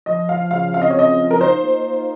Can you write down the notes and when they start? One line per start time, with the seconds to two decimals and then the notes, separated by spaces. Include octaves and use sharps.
0.06 F3 D#5
0.28 F4 F5
0.51 C#3 F5
0.74 C4 F5
0.82 D#5
0.90 C#5
0.95 F3 D#5
1.18 F4
1.31 A#4
1.41 D#4 C5
1.62 A#3
1.85 A#3